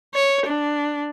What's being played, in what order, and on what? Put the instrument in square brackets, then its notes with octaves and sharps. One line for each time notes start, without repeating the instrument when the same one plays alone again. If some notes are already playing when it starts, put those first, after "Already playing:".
[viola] C#5
D4